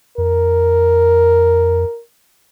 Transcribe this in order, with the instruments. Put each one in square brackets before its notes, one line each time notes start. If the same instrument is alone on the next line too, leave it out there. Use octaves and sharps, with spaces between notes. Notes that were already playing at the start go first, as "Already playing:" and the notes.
[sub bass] F2 [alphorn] A#4